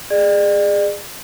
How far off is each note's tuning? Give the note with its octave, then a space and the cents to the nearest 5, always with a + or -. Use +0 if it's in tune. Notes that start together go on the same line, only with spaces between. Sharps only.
G#4 -15 D5 +40